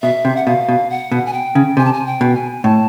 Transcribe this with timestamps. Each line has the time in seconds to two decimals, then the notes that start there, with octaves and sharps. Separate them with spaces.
0.02 B2 E5
0.25 C3
0.36 F#5
0.46 B2 F5
0.69 B2
0.90 F#5
1.12 B2
1.26 G#5
1.33 G5
1.55 C#3
1.77 C3 G#5
1.85 A5
1.93 G#5
2.06 G5
2.21 B2
2.35 G#5
2.64 A2 A5